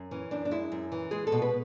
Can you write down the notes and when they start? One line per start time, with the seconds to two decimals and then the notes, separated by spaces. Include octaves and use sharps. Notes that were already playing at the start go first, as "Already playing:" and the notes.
Already playing: F#2
0.11 E3 C#4
0.31 F#2 D4
0.45 D4
0.51 G#3 E4
0.72 F#2
0.92 E3
1.11 G#3 G#4
1.27 A4
1.32 B2
1.42 B4